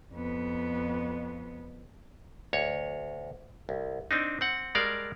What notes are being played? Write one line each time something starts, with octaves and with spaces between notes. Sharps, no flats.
F2 B3
D2 C#5
C2
C4 D4 D#4
C4 F#5
G3 G#3 A#4 D5 F5